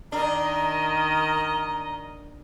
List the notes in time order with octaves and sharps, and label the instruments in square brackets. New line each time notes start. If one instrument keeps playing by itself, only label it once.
[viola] D#3 D#5 [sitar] D4 [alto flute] A#5